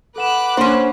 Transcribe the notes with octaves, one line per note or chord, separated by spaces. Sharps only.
A4 B4 F#5 D6 F#6 E7
A#3 C#4 D4 C5